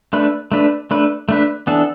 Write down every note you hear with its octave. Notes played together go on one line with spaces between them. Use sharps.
A3 D4 B4
A3 D4 B4
A3 D4 B4
A3 D4 B4
E3 B3 D4 A4